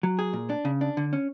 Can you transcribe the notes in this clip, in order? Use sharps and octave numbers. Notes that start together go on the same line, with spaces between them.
F#3
G#4
A#2
D4
C#3
D4
D3
C#4